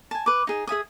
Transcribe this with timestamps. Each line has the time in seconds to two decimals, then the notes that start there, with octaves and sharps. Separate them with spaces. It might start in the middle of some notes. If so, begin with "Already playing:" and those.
0.11 G#5 A5
0.26 B4 D6
0.47 D#4 G#4
0.67 G#4 E5 G#5 D#6